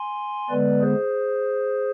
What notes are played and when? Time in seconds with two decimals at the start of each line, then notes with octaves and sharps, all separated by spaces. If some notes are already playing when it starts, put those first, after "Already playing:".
Already playing: G#5 C6
0.50 D3 G#3 B3 B4 D5
0.81 G#4 C5